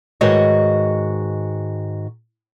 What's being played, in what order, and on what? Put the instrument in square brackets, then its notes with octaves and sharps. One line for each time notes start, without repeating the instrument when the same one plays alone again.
[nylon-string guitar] G#2 D#3 F#4 B4 C#5 D#5